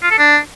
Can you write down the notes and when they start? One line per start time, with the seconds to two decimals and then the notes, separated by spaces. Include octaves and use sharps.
0.03 F4
0.11 A4
0.19 D4